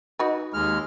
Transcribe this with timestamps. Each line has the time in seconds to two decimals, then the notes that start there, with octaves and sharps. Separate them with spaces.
0.19 D#4 F#4 B4
0.54 D#2 G#3 F6